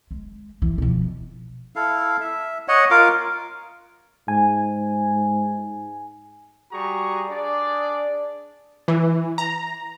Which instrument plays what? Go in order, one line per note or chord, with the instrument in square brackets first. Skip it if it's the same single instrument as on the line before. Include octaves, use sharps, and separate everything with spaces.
[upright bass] G#3
E3
B2 F3
[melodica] E4 A4 F5
E5
C#5 D#5 F#5
F4 A#4 F5 D6
[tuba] G#2 [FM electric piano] G#5
[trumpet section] G3 F#4 G#4 A#5 C#6
D4 G#4 D5
[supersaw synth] E3
A#5